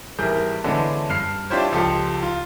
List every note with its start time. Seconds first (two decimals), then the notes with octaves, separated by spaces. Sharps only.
0.19 G#1 E3 G3 G#4 A#4 G6
0.64 D3 E3 G#3 B3 C#4 D4
1.09 G2 F6 C7
1.50 D4 E4 F4 G4 C5 C#5
1.72 C#2 F3 G#3 G4 A4
2.23 F4